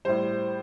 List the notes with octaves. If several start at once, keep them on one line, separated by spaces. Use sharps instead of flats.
A2 G3 C5